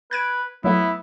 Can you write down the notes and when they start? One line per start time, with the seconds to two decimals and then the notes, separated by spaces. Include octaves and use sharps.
0.11 B4 F#6 G#6 D7
0.64 F#3 A3 B3 E4